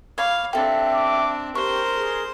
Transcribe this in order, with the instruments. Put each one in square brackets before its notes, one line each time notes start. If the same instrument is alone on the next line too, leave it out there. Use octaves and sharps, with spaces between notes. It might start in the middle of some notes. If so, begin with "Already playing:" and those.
[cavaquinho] C#5 B5 D6 [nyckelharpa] F5
[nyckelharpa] C4 D4 [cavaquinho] G4 A4 [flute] E5
[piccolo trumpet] D6
[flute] G4 [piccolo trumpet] A#4 [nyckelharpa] C5 C6 [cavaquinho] C#6
[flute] G#4